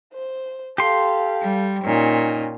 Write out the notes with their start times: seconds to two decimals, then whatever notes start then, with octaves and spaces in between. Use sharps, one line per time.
0.13 C5
0.78 G4 A4 F5 C6
1.42 G3
1.85 A#2 C#4 D#4